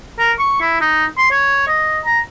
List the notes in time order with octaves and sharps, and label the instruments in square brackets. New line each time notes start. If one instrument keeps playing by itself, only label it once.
[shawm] A#4
C#6
E4
D#4
C6
C#5
D#5
A#5